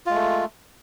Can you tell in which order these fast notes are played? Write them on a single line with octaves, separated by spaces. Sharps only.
F4 G#3 A3